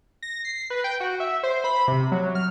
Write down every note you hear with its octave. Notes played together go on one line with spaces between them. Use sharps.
A#6
C7
B4
G5
F#4
E5
C5
B5
C3
F#3
F6